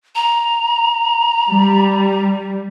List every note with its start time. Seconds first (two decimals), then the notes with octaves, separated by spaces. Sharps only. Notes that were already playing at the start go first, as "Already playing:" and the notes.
0.15 A#5
1.50 G3